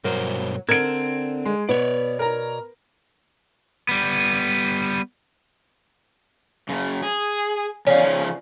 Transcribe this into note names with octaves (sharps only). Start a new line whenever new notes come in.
G2 B2 F#3 A#4 C5
D3 C4 A#4 G#6 D7
G#3
B2 B3 C#5 D5
A#4 A#5
G3 B3
F#2 C#3
G#4
E2 C#3 C#4 F5
C#3 F3